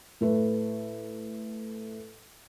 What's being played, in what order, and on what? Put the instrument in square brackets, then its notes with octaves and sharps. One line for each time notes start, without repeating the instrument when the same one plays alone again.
[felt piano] A2 A3 B4